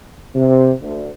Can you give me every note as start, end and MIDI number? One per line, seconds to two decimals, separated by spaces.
0.35 0.71 48
0.81 1.08 38